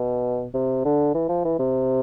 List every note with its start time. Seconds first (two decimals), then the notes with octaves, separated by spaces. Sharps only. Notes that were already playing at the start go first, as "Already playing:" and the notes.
Already playing: B2
0.54 C3
0.85 D3
1.15 E3
1.29 F3
1.45 E3
1.60 C3